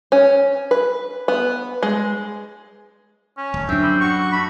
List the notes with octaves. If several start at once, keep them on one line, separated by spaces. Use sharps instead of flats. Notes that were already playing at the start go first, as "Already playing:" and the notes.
C#4
B4
B3
G#3
C#4
D1
F#2 C4 D4 E5
G3
F#4 C#6
A3 B5